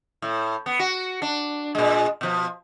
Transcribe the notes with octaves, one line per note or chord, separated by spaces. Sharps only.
A2
B3
F#4
D4
A#2 G#3
B2 F3